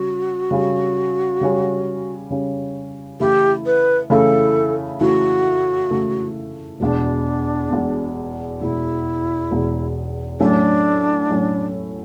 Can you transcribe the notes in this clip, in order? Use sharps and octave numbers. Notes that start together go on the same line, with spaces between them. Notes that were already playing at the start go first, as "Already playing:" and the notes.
Already playing: C#3 G3 C#4 F#4
C#3 G3 C#4
C#3 G3 C#4
C#3 G3 C#4
C#3 E3 A3 E4 G4
B4
C#3 E3 A3 E4 A4
C#3 E3 A3 E4 F#4
C#3 E3 A3 E4
E1 E2 B2 D4
E1 E2 B2
E1 E2 B2 E4
E1 E2 B2
A2 F#3 A3 C#4 D4
A2 F#3 A3 C#4